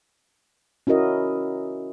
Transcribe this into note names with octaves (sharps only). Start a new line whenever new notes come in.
C#4 E4 F#4 A#4 D#5